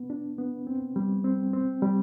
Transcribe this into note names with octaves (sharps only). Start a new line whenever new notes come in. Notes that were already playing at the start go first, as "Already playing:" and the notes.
Already playing: B3
D4
B3
C4
G3
C4
C4
G3